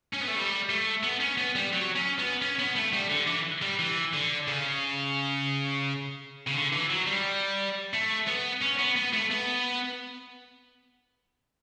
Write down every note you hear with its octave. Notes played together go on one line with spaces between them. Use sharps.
C#4
B3
A3
G3
A3
B3
C#4
B3
G3
F#3
C#4
B3
C#4
B3
A3
G3
D3
E3
G3
E3
D3
C#3
C#3
D3
E3
F#3
G3
A3
B3
C#4
B3
B3
A3
B3